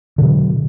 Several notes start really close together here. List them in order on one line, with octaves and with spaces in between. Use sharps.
D3 B2 F#3